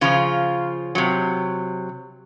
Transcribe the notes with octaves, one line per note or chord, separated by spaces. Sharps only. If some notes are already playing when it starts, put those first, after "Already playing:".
C#3 F3 F4
C3 F#3